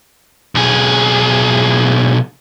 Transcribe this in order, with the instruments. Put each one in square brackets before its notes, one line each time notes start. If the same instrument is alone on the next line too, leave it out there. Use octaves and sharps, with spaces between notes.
[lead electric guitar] B1 G#4